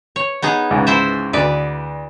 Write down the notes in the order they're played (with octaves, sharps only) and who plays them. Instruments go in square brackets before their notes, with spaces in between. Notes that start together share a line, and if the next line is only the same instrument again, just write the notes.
[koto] C#5
B3 D#4 G#4
[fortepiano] C#2 G#2
[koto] E4 C5 E5
[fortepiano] D2 [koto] B4 D5